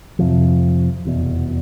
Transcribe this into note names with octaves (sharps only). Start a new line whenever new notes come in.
F2 C3 F3
F1 E2 B2